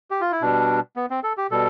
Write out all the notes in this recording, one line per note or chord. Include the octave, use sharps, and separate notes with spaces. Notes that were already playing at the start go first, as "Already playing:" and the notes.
G4
F4
E4
B2 G3 D4
B3
C4
A4
G4
B2 G3 A4